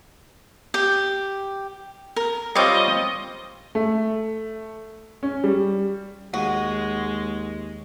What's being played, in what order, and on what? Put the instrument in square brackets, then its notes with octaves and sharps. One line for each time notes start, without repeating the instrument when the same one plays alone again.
[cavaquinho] G4
A#4
[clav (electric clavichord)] G3 C4 F4 [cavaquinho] C#5 D6 [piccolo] D#5
[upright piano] A3
C#4
G3
[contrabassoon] D#2 [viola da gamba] G#3 [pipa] F#4